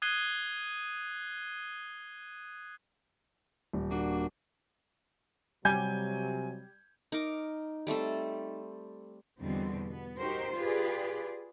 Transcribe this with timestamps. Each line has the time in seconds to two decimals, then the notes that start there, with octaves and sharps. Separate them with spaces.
0.02 D#6 F#6 G#6 C7 D#7 G7
3.73 D#1
3.91 A#3 D4 F#4
5.65 C3 F#3 G3 G#5 G6 G#6
7.12 D#4 A#4 D6
7.87 G3 A3 C4 A4
9.38 E2 B2 D3 G3 C4
9.87 B3
10.17 D#4 F#4 G4 A#4 C5
10.54 F4 G4 G#4 B4 D5